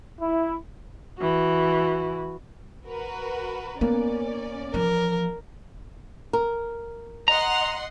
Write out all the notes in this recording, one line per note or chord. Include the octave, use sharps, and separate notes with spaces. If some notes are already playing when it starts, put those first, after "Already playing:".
E4
E3 F#4
F#4 A#4 B4
A#3 B3 C#4 D5
E3 F3 A#4
A#4
D#5 F#5 A#5 C6